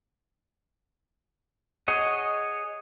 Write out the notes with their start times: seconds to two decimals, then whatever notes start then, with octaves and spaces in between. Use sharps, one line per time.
1.88 G#4 C#5 D#5 F#5